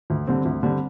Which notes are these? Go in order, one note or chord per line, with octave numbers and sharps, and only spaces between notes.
D2
D3 G3 C4
D2
D3 G3 C4